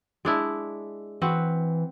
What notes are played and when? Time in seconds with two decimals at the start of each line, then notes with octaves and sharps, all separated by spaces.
0.25 G#3 D4 E4
1.22 E3 C4 F#4 B4